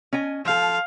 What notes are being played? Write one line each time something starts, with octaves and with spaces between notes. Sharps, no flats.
C#4 D#5 G#5
F3 A4 F5